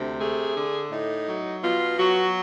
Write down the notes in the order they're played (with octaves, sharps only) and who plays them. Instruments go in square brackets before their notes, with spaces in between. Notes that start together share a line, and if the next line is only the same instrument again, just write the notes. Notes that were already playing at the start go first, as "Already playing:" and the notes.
Already playing: [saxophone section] D2 C3
A3 G#4
D3
A2 D#4
F#3
B2 F4
F#3 F#4